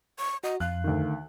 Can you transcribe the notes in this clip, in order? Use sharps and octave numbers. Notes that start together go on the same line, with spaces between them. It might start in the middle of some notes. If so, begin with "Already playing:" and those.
C#6
F#4 D#5
F2 F5 F#6
D2 D#3